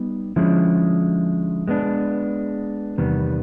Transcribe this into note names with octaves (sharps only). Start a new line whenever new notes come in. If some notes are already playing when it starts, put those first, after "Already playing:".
Already playing: G3 B3 D#4
D3 F3 G#3 C#4 E4
G#3 B3 D4
E2 C3 D#3 G3 B3